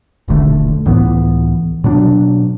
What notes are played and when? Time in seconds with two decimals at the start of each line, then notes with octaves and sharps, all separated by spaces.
0.28 D#1 B1 D3 A3
0.86 C#2 A2 E3 B3
1.84 B2 F#3 D4